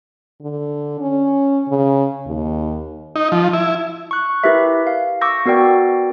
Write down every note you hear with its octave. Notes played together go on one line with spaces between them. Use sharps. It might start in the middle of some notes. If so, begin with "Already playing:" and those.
D3
C#4
C#3
D#2
D#4
F3
E4
C#6 F#6
E4 G4 A#4 B4 E5
F5
C#6 D6 E6 G6 A#6
B3 F#4 A#4 D5 G5